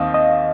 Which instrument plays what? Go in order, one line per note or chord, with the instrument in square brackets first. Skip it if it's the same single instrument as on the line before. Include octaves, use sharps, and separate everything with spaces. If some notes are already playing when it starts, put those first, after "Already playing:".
Already playing: [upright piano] D#2 D#3 C4 [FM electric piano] D#5 F5
[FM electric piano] D#5